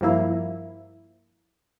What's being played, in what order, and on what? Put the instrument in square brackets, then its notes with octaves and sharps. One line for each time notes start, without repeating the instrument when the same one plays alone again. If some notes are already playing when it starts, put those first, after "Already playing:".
[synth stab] G2 F3 A#3 E4